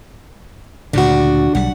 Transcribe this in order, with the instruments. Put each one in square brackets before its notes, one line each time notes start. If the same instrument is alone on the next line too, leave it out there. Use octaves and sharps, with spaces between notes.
[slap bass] D2 A#2 C#3 [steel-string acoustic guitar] D4 F#4
[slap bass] B1 G3 [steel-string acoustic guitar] F#5